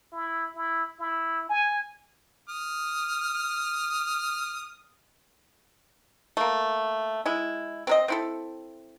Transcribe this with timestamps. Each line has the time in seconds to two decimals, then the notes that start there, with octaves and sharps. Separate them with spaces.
0.12 E4
0.55 E4
0.99 E4
1.49 G#5
2.49 D#6 F6
6.37 A3 A#3
7.26 G#3 E4
7.87 C4 A#4 D#5
8.08 C4 E4 A4